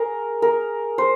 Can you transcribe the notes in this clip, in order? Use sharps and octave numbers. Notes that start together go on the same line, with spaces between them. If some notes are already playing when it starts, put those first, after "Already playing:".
Already playing: G#4 A#4
A#4
C5